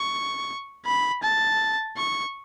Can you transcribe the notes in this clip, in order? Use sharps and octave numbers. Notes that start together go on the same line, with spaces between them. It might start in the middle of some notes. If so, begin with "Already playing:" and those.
Already playing: C#6
B5
A5
C#6